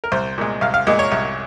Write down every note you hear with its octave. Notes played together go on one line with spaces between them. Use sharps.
A#4
C2 C5
A#2 G#3
C2 F5
F5
A#2 G#3 D#5
C#5
C2